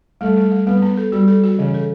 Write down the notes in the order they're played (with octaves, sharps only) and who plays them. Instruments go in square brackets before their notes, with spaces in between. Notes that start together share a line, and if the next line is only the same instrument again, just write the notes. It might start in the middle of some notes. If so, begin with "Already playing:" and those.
[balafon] G3 [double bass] A3
[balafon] G3
G3
[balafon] G3 [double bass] B3
[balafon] B3
A4
[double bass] G3 [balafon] F#4
[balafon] A4
F#4
[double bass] C#3 [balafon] E3
[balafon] A4